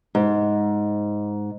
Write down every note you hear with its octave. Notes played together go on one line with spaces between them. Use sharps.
G#2